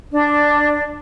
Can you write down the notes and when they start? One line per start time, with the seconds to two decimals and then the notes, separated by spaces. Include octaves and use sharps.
0.12 D4